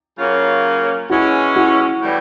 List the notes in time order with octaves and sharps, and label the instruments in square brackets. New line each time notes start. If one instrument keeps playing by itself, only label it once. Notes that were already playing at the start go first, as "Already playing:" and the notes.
[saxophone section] C#3 F#3 A#3 C#4 F4
[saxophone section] E3 G#3 C#4 [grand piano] E4 F#4
[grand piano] E4 F#4
[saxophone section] A2 E3 G3